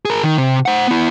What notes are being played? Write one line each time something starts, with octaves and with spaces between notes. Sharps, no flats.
G#4 A#4
D#3
C3
C5 F#5
B3 E4